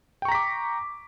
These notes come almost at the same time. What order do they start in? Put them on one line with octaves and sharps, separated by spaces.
G5 C#6 A#5 B6 D6